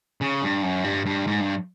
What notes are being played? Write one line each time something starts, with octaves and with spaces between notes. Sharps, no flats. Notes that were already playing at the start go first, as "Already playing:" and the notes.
C#3
G2
F#2
G2
G2
G#2
G2